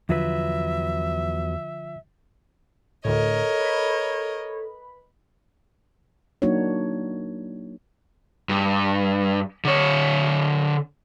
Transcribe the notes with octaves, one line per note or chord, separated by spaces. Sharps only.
E2 D3 F3 F#3 F4 B4 E5
D2 A2 A4 A#4 C#5 D#5
B4 B5
F#3 A#3 D4 D#4 F#4 C#5
G2
D3 C#5